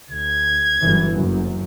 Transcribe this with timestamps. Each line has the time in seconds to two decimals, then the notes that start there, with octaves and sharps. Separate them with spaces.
0.10 D2 G#6
0.80 G1 F#2 E3
1.15 F#1 F#2